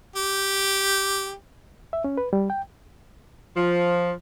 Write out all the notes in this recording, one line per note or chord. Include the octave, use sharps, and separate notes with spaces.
G4
E5
C#4
B4
G3
G5
F3